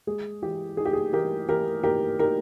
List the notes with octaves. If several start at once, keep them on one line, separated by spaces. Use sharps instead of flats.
G#3 G#4
E3 G4
D#4 G#4
G4
G#4
E3 G4 A#4
E3 G4 A#4
D#4 G4 A#4
D#4 G4 A#4